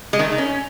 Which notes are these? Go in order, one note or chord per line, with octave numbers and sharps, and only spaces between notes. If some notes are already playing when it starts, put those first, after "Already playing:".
G#3
D#3
A3
D#3
C#4